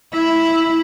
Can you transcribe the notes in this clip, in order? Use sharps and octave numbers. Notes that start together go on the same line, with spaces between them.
E4